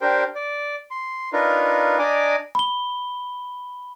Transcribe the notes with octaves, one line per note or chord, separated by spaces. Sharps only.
D4 G4 A#4 C5 G5
D5
C6
D4 D#4 F4 A#4 B4
D4 D5 D#5 G#5 A#5 D6
B5 G7